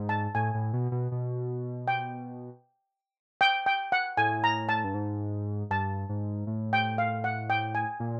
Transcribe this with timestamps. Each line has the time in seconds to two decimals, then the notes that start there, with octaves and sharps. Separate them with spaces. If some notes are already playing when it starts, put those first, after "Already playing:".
Already playing: G#2
0.09 A5
0.35 A2 G#5
0.54 A2
0.73 B2
0.92 B2
1.12 B2
1.88 G5
3.41 G5
3.66 G5
3.92 F#5
4.17 A2 G#5
4.44 A#5
4.69 A5
4.84 G2
4.94 G#2
5.70 G2 A5
6.09 G#2
6.47 A2
6.73 G5
6.98 F5
7.24 F#5
7.50 G5
7.75 G#5
8.00 A#2